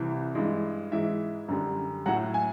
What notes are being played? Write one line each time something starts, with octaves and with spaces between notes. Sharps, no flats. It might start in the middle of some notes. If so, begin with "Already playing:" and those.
Already playing: C2 C3 E3
G2 E3 G#3
G#2 E3 G#3 E5
F#2 D3 G3
A2 F#3 F#5
G#5